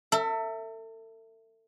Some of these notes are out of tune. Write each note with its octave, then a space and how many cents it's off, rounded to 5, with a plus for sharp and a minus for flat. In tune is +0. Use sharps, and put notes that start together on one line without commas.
A4 +40 E5 +0